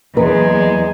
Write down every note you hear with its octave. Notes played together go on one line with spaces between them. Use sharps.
E2 F#3 G#3 A#3 B4 A#5